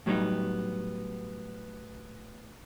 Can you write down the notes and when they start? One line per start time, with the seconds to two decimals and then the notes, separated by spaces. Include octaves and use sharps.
0.06 A2 F#3 G3 B3 D#4